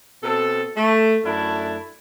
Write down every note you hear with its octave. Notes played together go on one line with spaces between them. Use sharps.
B2 C4 A4
A3
F#2 A3 D4 E4 A5